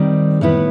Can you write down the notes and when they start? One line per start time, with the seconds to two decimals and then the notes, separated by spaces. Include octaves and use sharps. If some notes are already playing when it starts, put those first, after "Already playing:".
Already playing: D#3 G3 C4
0.41 A2 G3 B3 E4 B4